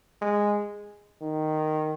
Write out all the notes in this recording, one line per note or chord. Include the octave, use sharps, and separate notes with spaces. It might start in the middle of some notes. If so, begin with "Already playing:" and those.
G#3
D#3